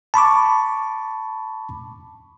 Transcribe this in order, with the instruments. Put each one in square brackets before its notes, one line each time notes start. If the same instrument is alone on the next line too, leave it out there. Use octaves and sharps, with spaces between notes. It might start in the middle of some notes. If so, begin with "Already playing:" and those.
[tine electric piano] A5 B5 C#6 D6